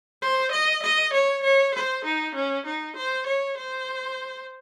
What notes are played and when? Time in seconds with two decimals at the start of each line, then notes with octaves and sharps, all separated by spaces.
0.22 C5
0.52 D#5
0.83 D#5
1.14 C#5
1.44 C#5
1.75 C5
2.05 D#4
2.35 C#4
2.66 D#4
2.96 C5
3.27 C#5
3.58 C5